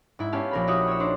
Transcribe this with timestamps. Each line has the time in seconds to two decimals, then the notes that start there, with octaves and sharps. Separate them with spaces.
0.19 G#2 E4
0.32 B3 C#4 G4 F5 A5
0.51 A#1 A#4 B5
0.67 E4 F#4 G4 D#5 F#5 D#6
0.87 C#5 E6
1.00 D4 D#4 C5